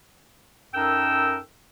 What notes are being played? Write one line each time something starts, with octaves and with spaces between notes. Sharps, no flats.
F#2 D#4 A4 A#4 G5 E6